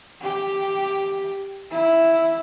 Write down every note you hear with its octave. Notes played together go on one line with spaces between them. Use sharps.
G4
E4